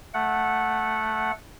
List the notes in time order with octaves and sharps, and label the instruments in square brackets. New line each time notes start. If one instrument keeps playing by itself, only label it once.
[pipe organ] A3 F#5